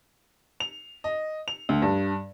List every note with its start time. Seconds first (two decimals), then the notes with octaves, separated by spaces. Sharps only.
0.60 F7
1.04 D#5
1.48 F7
1.69 D2
1.82 G2